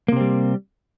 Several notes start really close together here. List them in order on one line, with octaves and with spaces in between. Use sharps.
A#3 C3 C4 G3